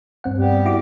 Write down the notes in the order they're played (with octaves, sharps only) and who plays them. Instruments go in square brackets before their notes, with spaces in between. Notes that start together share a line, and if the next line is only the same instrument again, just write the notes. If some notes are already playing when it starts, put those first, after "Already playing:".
[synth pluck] G2 C4 F#5
[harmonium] G3 B3 G4
[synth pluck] E4 F#4 D6